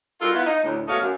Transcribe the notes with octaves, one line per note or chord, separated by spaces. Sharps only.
G3 D#4 F4 F#4 A4 A#4
B3 E4 F4
D#4
D2 A2
G#2 B2 A3 C#5 D#5 F5
F#2